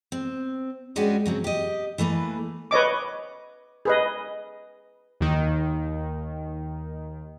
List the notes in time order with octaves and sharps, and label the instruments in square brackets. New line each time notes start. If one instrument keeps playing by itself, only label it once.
[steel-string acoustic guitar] C4
G3 G#3 C#4 D4 F#4 G4
C#3 F#3 C4
G4 D#5
E3 A3 A#3 B4
[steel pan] B4 C#5 D#5 D6
G#4 B4 D#5
[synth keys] D#2 D#3